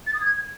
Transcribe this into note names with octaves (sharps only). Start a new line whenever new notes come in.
A6
D#6
G#6